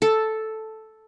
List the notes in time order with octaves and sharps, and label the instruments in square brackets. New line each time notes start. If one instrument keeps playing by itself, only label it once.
[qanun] A4